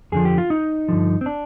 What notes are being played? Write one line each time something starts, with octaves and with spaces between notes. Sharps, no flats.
F2 D3 F3 G#4
G4
F4
D#4
G2 D3 F3
C4
D4